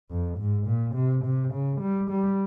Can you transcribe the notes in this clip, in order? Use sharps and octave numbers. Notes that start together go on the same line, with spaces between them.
F2
G#2
A#2
C3
C3
C#3
G3
G3